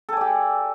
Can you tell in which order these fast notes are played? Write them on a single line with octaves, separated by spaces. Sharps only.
A4 G#5 D5 G4